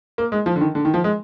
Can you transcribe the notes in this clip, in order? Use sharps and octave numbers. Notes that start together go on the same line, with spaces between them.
A#3
G#3
F3
D3
D#3
D3
D#3
F3
G#3